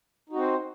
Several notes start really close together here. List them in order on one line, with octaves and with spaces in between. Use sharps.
D#4 F#4 C4 C5